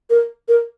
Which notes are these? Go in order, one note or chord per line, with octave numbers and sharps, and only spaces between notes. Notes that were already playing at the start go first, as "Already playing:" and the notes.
A#4
A#4